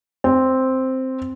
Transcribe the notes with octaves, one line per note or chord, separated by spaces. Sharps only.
C4